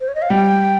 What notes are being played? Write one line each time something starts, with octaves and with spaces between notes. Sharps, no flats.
C5
C#5
D#5
F5
G3 G5